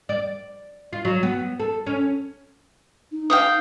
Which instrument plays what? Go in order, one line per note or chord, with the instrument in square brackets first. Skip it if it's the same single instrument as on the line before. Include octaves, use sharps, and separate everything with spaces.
[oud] D5
F4
F#3
B3
A4
C#4
[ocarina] D#4
[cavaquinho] F5 G5 D#6